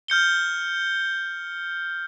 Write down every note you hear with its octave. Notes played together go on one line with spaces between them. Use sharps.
F6 G6 C#7 G7